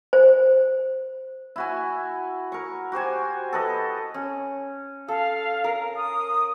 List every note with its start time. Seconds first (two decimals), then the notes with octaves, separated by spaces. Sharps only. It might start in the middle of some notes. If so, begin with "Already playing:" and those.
0.13 C5
1.56 E4 F#4 G#5
2.52 A#4 C#6
2.92 F#4 G4 C5 G#5
3.53 A4 B4 D#5
4.14 C#4
5.08 A4 F5
5.64 A#4
5.96 D#6